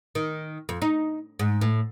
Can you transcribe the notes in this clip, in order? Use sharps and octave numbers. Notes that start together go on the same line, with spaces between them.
D#3
F2
D#4
G#2
A2